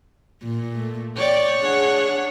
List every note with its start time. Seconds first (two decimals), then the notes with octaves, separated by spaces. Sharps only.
0.44 A#2
0.75 A3
1.17 C#5 D5 G5
1.60 D4 G#4 F#5